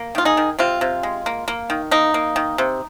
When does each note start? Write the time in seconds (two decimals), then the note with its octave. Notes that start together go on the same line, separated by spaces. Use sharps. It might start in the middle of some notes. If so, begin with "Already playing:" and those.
Already playing: A#3
0.15 D#3 F4
0.25 D#4 G#4
0.37 D#3
0.59 C3 C4 F4
0.81 C3
1.03 G#3
1.26 A#3
1.48 A#3
1.70 D#3
1.91 A#3 D#4
2.14 A#3
2.36 D#3
2.58 C3